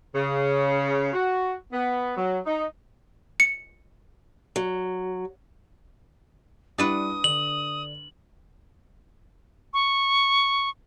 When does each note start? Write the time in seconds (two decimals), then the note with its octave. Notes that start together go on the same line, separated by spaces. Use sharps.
0.15 C#3
1.13 F#4
1.73 B3
2.17 F#3
2.46 D#4
3.40 C#7
4.56 F#3
6.78 G3 D4 E4 B4 F#5 D#6
7.24 D3 F#7
9.74 C#6